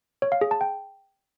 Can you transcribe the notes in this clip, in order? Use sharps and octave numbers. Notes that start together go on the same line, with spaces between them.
C#5
F5
G#4
A5
G5